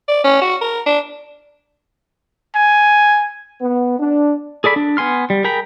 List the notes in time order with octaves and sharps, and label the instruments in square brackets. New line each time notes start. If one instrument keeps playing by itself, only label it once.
[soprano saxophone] D5
C#4
F#4
A#4
D4
[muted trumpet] G#5
[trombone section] B3
D4
[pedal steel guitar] G#4 A4 D5 B5
D4
B3 G#5 C6 F6
G3
G#4 A#4 G5 A#5 B5